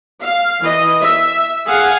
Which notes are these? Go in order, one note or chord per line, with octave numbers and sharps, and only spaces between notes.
F5
E3 D#5
E5
G#4 F5 F#5 G#5